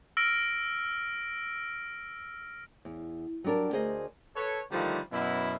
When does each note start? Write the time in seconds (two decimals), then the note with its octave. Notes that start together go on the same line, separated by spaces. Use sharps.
0.17 E6 F6 A#6 D7
2.85 E2
3.44 F#3 G3 D4 A#4 A5
3.73 D2 G#4 A#4 C5 D#5
4.35 A4 B4 C#5
4.71 D3 D#3 F3 G3 A3 A#3
5.12 F#2 B2 E4